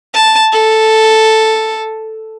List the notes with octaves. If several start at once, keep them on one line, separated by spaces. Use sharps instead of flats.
A5
A4